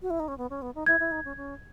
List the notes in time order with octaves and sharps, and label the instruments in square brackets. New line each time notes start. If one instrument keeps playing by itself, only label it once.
[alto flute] F#4
E4
D#4
C#4
B3
C#4
B3
D#4
[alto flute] E4 [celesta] G#6
[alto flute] E4
D#4
C#4
C#4